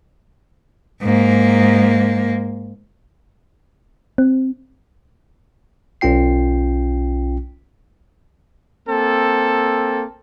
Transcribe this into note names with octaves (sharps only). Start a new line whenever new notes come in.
G#2 A#3
C4
B1 C#4 F4 G5 C7
A#3 C4 A4